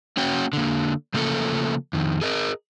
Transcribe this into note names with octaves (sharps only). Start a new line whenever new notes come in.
A#3 C#4 F#4 G5
D3 A#3
C#3 F3 A3 A#3 C#4 A4
F2 D#3
G#4 A#4 D#5